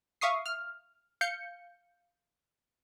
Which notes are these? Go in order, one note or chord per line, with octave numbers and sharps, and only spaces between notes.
E5 F5 C#6 D#6 C7
F6
F5 G6 C#7